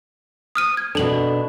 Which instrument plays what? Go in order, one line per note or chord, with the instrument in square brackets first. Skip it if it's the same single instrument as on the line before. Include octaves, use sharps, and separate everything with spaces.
[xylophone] D#6 F6 D#7
G#6
[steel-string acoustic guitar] B2 D4 [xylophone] A4 F#7